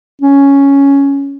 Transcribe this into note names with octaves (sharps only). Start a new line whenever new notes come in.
C#4